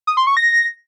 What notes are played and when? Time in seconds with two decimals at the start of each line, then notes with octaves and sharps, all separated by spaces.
0.07 D#6
0.17 C6
0.27 C#6
0.37 A#6